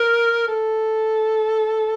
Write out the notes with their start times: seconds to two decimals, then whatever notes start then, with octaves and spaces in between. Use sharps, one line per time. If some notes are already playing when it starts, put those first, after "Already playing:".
Already playing: A#4
0.48 A4